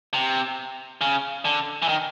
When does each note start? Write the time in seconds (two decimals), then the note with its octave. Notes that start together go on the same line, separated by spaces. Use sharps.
0.14 C3
1.01 C#3
1.45 D3
1.82 E3
1.88 D#3